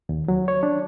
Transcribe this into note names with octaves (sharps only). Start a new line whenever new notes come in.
D#2
F#3
C#5
D4